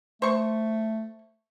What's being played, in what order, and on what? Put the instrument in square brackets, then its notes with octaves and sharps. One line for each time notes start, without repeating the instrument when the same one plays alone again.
[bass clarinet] A3 [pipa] C5 C#6